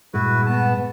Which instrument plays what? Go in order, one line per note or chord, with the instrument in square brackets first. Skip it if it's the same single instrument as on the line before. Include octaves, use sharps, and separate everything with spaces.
[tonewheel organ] G2 A#2 G#3 [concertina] E4 F#4 B4
[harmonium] B3 [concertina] A5